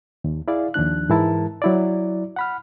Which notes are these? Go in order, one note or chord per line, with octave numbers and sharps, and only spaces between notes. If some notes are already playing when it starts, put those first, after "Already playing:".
D#2
E4 G#4 D5 F5
D#2 F3 D4 F#6
G#2 E3 G#3 E4 A#4 A5
F#3 E4 D5
F#5 B5 F6